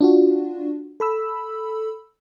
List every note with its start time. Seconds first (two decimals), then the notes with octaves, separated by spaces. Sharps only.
0.01 D4 F4 F#4
1.00 A4 B5 E6